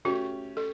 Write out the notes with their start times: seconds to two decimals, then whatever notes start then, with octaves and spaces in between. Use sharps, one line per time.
0.05 A3 C#4 F#4 G4
0.57 A4